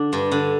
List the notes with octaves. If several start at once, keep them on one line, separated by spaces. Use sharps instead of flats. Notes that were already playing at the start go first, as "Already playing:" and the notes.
Already playing: D3 D4
G2
D3